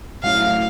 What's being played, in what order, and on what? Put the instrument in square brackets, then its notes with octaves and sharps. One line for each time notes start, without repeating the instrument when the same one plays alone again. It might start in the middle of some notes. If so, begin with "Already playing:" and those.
[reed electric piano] A2 F#3 A3 C#4 E4 [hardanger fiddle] F5